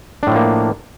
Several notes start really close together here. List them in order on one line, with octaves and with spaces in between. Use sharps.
D4 A2 F3 A#3